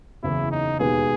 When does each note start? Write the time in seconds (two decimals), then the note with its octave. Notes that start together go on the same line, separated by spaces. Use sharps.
0.23 F#1 E2 C#3 E3 E4
0.51 D#4
0.79 E1 D#2 D#3 G#3 B3 G#4